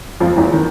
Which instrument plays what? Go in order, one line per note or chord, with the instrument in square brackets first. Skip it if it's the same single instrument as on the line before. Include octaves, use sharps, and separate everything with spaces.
[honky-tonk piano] F2 F3
E2 E3
D#3